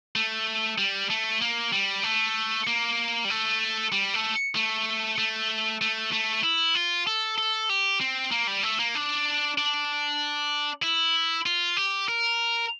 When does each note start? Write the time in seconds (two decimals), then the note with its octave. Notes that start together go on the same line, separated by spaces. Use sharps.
0.16 A3
0.78 G3
1.10 A3
1.41 A#3
1.73 G3
2.03 A3
2.67 A#3
3.25 G3
3.30 A3
3.92 G3
4.14 A3
4.55 A3
5.18 A3
5.81 A3
6.12 A3
6.44 E4
6.75 F4
7.07 A4
7.38 A4
7.69 G4
8.00 C4
8.31 A#3
8.47 G3
8.63 A3
8.79 A#3
8.95 D4
9.58 D4
10.83 E4
11.46 F4
11.77 G4
12.08 A#4